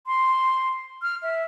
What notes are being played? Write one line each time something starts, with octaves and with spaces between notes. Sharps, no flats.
C6
F6
E5